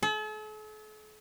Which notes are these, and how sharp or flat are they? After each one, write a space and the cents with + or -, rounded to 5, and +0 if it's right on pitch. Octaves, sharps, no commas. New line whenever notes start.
A4 -45